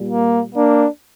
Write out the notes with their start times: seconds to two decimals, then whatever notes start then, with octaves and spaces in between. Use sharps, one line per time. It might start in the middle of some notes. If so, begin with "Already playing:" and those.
Already playing: A#2 G3
0.09 A#3
0.55 A#3 D4